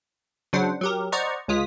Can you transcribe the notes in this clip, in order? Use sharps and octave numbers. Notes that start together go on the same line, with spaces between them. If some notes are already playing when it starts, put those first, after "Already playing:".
C#3 F#3 D4 C5 F#5
F#3 G4 A#4
C5 D5 D#5 F#5 A#5 C#6
C#2 G#3 F4 D#6 B6